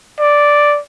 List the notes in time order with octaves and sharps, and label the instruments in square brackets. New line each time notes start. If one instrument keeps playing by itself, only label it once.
[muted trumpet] D5